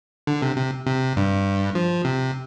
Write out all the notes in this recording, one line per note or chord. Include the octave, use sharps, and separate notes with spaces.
D3
C3
C3
C3
G2
F3
C3